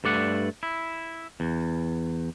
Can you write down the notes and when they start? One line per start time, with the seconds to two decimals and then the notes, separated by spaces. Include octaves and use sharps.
0.04 G2 A3 D5 F#5
0.63 E4
1.40 E2